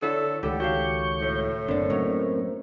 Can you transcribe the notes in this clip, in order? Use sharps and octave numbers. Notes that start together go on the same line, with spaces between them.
D3 E4 A4 C#5
C#2 A2 D#3 G4 A4 F#5
F#4 A4 C#5 F5 C#6 G6
A2
F#1 D3 A#3 C4 D4
F#3 A3 C#4 D#4